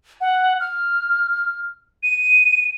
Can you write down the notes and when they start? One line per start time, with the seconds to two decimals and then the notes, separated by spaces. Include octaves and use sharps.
0.21 F#5
0.60 F6
2.03 D#7